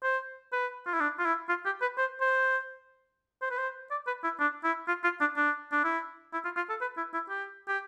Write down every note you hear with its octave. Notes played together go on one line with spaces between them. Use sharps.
C5
B4
F4
E4
D4
F4
E4
F4
G4
B4
C5
C5
C5
B4
C5
D5
B4
E4
D4
E4
F4
F4
D4
D4
D4
E4
E4
F4
F4
A4
B4
E4
E4
G4
G4